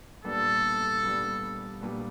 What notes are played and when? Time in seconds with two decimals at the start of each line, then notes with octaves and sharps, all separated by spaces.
0.24 A#2 G3 B3 D4 A4
1.02 A#2 G3 B3 D4
1.81 A#2 G3 B3 D4